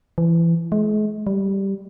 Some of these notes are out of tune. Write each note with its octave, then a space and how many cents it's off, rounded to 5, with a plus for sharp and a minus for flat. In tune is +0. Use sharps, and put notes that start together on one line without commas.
E3 +25
G#3 +40
G3 -5